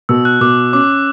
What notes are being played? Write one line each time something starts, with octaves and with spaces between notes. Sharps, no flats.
B2 E6
F#6
B2 D6
C#4 D6